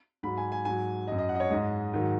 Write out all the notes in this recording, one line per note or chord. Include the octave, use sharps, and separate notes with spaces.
G#2 F#3 B5
G#5
G#5
G#2 F#3 G#5
F#2 F#3 D#5
D#5
F#5
D#5
C#5
G#2 G#3 D#5
G#2 D#3 F#3